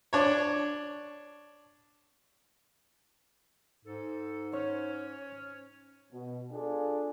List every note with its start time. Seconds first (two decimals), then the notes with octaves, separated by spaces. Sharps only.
0.13 D4 C#5
3.85 G#2 A4
4.52 C#4 C5 C#5
6.13 B2
6.52 D4 F4 G#4 A4